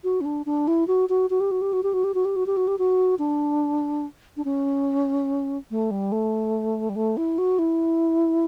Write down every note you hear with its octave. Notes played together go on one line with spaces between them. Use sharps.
F#4
C#4
D4
D4
E4
F#4
F#4
F#4
G4
F#4
G4
F#4
G4
F#4
G4
F#4
G4
F#4
G4
F#4
G4
F#4
D4
D4
C#4
A3
G3
A3
G3
A3
E4
F#4
E4